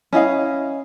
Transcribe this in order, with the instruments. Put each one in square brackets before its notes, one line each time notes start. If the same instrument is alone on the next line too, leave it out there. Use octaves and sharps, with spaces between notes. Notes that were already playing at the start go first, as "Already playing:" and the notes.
[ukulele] C#4 E4 D#5 F5